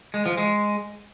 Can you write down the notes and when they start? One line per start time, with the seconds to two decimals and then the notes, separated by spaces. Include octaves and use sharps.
0.14 G#3
0.26 F3
0.37 G#3